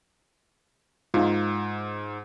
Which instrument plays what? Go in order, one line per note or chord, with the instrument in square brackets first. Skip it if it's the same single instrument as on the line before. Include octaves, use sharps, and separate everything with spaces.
[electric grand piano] G#2 [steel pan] D#4 F4